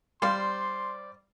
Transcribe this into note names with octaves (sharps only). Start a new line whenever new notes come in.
G3 C5 D5 F5 C6